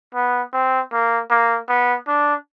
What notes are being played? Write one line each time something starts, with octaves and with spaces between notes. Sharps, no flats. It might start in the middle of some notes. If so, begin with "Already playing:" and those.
B3
C4
A#3
A#3
B3
D4